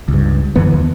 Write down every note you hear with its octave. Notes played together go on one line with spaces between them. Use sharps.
C#2 G2
F#2 D3 E3 B3
D#2